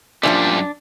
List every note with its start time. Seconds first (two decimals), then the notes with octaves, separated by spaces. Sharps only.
0.23 F#2 A#2 E3 F3 G3 D4